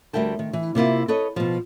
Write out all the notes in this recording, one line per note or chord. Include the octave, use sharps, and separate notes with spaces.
D2 G3 A#4 E5 G5 A5
D#3
E3
C3 A#3 E4 F4
A4 B4 C#5 D#5
B2 F3